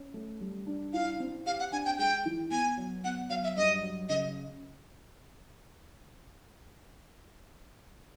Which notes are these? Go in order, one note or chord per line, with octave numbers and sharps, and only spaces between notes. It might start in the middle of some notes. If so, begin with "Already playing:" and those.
Already playing: C#4
A3
G3
D4
E4 F5
C4
G4 F5
F#5
D4 G#5
G5
G#3 G5
E3
B3 G#5
F#3
B3 F#5
F#3 F5
E5
G2 D#5
F#3
C#3 D#5